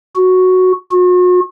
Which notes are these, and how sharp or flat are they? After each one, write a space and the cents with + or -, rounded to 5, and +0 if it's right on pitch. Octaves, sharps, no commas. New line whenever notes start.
F#4 +0
F#4 -40